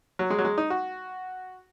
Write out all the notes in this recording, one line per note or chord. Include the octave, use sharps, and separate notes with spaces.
F#3
G#3
F#3
G#3
D#4
F#4